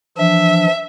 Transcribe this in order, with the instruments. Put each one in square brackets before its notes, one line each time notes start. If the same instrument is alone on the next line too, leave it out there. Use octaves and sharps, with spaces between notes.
[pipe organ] E3 F3 D4 [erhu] E5